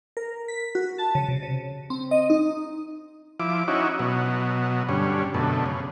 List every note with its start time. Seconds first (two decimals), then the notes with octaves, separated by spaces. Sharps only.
0.17 A#4
0.48 B6
0.75 F#4
0.98 A5
1.15 C#3
1.28 C3
1.43 C#3
1.90 C4
2.11 D#5
2.30 D#4
3.40 F3 E4 D6
3.68 C#4 D#4 E4 F#4
3.99 B2 F#3
4.89 G2 D3 C#4
5.34 F#2 B2 D3 A3
5.66 C#3